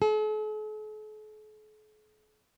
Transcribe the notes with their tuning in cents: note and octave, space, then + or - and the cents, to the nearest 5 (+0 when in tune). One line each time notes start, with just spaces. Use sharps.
A4 -45